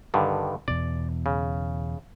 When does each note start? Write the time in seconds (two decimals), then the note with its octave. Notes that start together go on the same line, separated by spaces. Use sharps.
0.14 G2 D3 D#3
0.68 E2 B2 D5
1.26 C#3